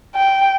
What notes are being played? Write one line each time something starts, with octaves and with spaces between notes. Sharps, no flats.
G5